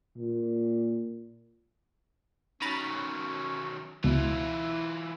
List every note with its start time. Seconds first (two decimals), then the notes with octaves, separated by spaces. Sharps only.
0.18 A#2
2.62 D#3 F#3 C#4 A#5 B5 A6
4.04 C#2 B2 E3 E4 F4